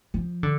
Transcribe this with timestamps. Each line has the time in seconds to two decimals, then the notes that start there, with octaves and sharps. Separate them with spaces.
0.14 F3
0.43 D3